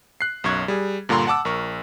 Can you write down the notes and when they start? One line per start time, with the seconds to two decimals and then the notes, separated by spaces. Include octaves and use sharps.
0.21 F#6 C7
0.44 B1 F#2 C#6 G#6
0.68 G3 G#4
1.09 G2 A#2 D3 A#5 C6
1.27 F#5 A5 D6 E6
1.45 A#1 A#4 C#6